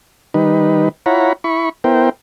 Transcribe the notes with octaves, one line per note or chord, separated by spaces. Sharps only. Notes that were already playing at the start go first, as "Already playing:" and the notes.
D#3 G3 D#4 B4
E4 F4 C#5 F#5 A#5 B5
E4 B5 C#6
B3 E4 A#4 C5 G5